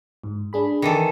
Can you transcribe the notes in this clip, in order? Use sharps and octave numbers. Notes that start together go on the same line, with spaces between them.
G#2
D4 G#4 B5
D#3 E3 A4